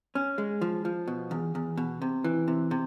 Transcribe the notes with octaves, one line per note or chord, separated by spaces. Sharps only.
C#4
G#3
F3
F3
B2
E2
E2
B2
C3
E3
C3
C3